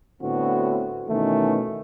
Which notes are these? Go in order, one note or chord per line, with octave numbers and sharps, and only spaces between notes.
A2 D3 B3 C4 F#4
B2 D#3 E3 A3 C#4